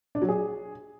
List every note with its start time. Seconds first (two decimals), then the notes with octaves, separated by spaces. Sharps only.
0.15 D4
0.22 F#3
0.29 G#4